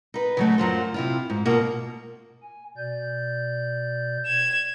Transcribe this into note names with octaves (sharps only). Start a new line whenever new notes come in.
D#4 B4
C#3 F#3 A3
F#2 F#3 F4 C5
C3 E4 F4
G#2
B2 A#3 F4
G#5
B2 D5 G6
G#6 E7